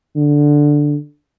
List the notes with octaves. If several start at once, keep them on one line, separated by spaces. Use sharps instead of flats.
D3